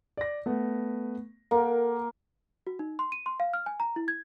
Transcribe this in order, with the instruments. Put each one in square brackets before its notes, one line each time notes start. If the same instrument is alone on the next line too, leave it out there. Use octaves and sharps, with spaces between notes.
[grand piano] D5 A#6
A3 B3
[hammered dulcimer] A#3 [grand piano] A4 A#4 F#5
[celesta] F#4
D#4
C6
D#7
C6
F5
F6
G#5
A#5
E4
G#6